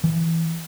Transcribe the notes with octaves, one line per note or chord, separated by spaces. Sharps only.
E3